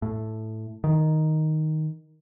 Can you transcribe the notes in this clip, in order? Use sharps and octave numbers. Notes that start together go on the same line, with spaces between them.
A2
D#3